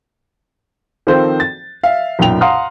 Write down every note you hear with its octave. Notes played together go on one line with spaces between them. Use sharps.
D#3 F3 C4 F4 A4 C5
A6
E5 F5
B1 F#2 A#2 G5 F7
F5 F#5 A#5 C6 D#6 F6